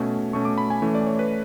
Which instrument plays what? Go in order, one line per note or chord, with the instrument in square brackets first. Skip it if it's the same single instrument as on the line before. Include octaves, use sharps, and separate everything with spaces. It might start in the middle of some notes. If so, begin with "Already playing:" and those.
Already playing: [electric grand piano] B2 A3 C#4
B2 A3 C#4 C#6
D6
B5
G#5
E3 A3 C#4
D5
C#5
B4